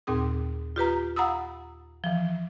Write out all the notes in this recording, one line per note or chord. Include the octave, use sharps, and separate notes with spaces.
D#2 A#2 C4 G#4 D#6
F4 G4 B4 A#5
F5 F#5 A#5 B5 D#6 E6
E3 F3